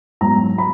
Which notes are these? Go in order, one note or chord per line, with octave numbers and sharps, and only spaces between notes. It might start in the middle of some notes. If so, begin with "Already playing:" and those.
G#2 F#3 B3 A#5
B5